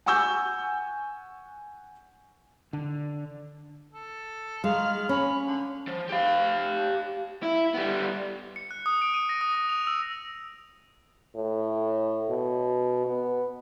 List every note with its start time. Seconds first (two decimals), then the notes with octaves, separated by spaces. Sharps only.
0.06 F#5 G#5 C#6 E6 G6
2.73 D3
3.93 A4
4.64 D#3 G#3 F5
5.09 C#4 C#5 B5
5.47 D3
5.88 F3
6.09 G4 F5
7.42 E4
7.74 G3 B3
8.56 C#7
8.71 F#6
8.86 D#6
9.02 D7
9.14 D#7
9.29 A#6
9.41 D#6
9.55 D#6
9.69 F7
9.87 E6
11.35 A2
12.29 B2
13.06 B3